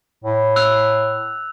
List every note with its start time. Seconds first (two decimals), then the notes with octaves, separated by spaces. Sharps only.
0.24 A2
0.56 E6 F#6 F7